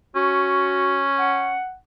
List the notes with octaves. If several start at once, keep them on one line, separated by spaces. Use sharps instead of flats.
C#4 F#4
F#5